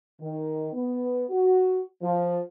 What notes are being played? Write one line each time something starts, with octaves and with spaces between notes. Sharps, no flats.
D#3
B3
F#4
F3